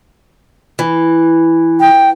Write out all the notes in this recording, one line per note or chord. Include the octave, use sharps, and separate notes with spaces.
E3
G5